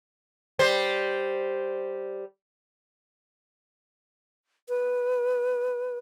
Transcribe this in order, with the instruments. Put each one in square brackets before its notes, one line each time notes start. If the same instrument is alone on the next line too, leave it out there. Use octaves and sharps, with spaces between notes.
[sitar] G3 C5
[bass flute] B4